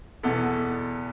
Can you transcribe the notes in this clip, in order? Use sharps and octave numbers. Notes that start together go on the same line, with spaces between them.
E2 B2 B3 E4 A4